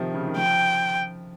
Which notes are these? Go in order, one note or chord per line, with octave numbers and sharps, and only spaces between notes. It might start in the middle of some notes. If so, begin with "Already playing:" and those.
Already playing: C3 D#3 F3
C#3
D#3
F3 G5